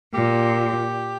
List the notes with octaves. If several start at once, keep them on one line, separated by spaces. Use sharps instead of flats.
A#2 G4